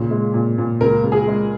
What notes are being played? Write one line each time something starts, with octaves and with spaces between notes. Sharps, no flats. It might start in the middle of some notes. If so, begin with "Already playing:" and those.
Already playing: A#2 C#3
G#3
A#2
A#2
C#2 A#4
C#2
G#4
G#3